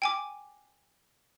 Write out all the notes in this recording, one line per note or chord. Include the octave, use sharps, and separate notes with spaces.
G5 G#5 D6